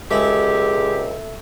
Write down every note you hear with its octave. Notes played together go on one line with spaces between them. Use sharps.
C#2 G#3 G4 A4 E5